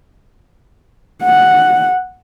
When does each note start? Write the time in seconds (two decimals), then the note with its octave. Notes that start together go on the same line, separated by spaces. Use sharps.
1.23 F#5